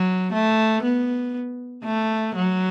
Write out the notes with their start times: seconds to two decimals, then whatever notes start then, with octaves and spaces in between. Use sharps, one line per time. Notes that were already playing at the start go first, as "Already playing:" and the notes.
Already playing: F#3
0.33 A3
0.83 B3
1.84 A3
2.35 F#3